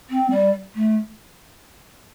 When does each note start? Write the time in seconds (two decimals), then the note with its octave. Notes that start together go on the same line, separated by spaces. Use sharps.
0.09 C4
0.30 G3
0.75 A3